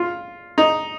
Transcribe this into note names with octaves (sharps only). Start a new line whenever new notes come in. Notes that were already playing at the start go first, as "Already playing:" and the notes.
Already playing: F4
D#4